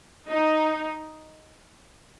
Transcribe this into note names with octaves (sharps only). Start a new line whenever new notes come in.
D#4